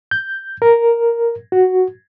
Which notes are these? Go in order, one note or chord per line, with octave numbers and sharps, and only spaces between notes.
G6
A#4
F#4